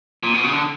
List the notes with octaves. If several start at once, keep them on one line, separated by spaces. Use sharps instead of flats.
A#2
B2
C#3
D3